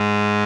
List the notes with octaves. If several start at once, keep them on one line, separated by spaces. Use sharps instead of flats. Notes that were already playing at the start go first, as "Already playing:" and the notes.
Already playing: G#2 G#3